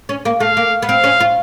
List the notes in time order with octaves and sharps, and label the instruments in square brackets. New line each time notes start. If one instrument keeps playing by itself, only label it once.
[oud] C#4
A#3
[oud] A3 [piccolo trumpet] F5
[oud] A#3
B3
[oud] C4 [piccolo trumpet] F5
[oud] C#4
F4